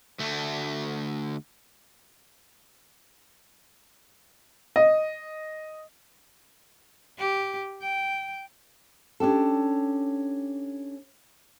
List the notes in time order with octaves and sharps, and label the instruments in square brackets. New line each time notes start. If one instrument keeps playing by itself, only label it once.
[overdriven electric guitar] D2 A3
[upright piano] D#5
[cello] G4
G5
[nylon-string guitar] C#4 D4 G4 A4